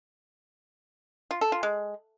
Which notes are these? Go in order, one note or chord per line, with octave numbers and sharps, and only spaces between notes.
F4
A4
F4
G#3